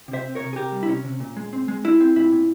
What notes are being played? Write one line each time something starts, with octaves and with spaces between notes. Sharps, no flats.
C3
C5 E5
C4
C3 A#4 C#5
G#4
C3 G4 A#4
G3
E4
C3 C#4
C3
A#2
G#3
C4
G#3
G#3 E4
C4
A#2 E4
A#2